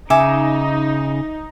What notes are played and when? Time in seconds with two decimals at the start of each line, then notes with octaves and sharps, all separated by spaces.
0.10 C#3 D#4 E5 G#5 D6